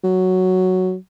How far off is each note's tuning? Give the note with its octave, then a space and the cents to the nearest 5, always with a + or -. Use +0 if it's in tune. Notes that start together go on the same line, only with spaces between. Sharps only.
F#3 +0